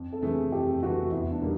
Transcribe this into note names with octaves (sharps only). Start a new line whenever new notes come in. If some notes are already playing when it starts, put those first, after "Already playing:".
Already playing: F2
A4
C3 E3 A3 G#4
F2 G4
C3 E3 A3 F#4
E2 E4
D4
B2 G3 A#3 D#4